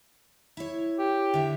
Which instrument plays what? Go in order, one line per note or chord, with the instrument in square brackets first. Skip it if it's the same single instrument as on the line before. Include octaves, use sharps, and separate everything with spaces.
[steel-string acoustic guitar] E4 C#5
[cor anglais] G4
[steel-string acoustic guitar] D3 E5